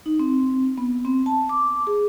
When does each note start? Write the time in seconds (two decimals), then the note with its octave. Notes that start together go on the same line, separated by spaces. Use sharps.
0.06 D#4
0.19 C4
0.78 B3
1.05 C4
1.26 A5
1.49 D6
1.87 G#4